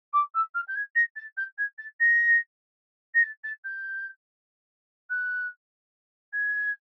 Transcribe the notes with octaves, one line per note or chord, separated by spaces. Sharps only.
D6
E6
F6
G6
G#6
A#6
A6
G6
G#6
A6
A#6
A#6
A6
A6
G6
F#6
G#6